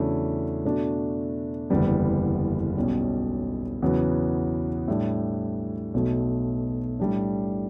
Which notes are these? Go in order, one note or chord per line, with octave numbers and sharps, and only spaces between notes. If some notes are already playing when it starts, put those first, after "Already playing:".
Already playing: E2 C#3 F#3 A3 D4
B2 A3 D4 F#4
F#1 E2 D3 G3 B3
B1 B2 G3 C#4
E2 C#3 F#3 B3
A2 G3 D4
B1 B2 A3
A2 G3 D4